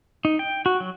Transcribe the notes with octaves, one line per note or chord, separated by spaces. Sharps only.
D#4
G5
F#4
F#3